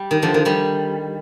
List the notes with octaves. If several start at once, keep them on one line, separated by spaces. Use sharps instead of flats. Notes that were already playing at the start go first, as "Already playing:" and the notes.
Already playing: G3
D#3
D3 F3
D#3
D#3 G3